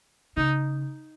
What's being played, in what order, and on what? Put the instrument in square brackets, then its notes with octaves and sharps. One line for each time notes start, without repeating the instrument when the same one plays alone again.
[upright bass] C#3 [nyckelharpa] D#4